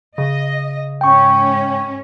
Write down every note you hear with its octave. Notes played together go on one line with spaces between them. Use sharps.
C#3 D#5
G#2 C#4 G5 C#6